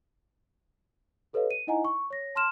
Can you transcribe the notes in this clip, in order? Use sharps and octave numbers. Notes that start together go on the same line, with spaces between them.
G4 A4 B4 C#5 D#5 F5
D#7
D#4 E4 D#5 F#5 G#5 A#5
C#6
C#5 A#6
A5 C6 F6 E7